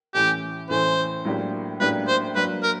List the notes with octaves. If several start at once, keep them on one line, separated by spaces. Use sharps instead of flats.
A2 E3 A3 C#4 G4
A2 E3 A3 C#4 C5
A2 F#3 A#3 D4 G4
A2 F#3 A#3 D4 G4 B4
C5
F#3 A#3 D4 B4
A#4